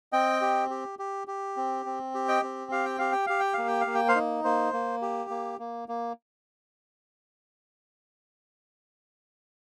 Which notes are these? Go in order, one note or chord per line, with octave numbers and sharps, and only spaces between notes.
C4 D#5 G5
G4
G4
G4
G4
C4
C4
G4
D#5 G5
C4
G4 F5
G5
G4 F5
G5
G4 F5
G5
A#3 F5
G5
F5
A#3
G5
C5 F5
D#4
A#3 C5
A#3
G4
A#3
A#3
A#3